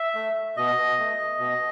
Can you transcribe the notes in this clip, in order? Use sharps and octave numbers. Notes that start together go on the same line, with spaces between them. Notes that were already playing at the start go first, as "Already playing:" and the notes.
Already playing: E5
A3
B2 D#5
A3
B2